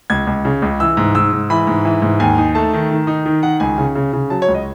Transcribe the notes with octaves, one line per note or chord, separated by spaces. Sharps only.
C#2 G#6
C#2
C#3
C#2
E3 E6
G#2
G#2 E6
G#2
E3 B5
G#2
E3
G#2
D#2 G#5
D#4
A3 A5
D#3
D#3
D#4
D#3
D#3 F#5
C#2 G#5
C#3
C#3
C#3
F#3 A5
C#5
C#2
D#5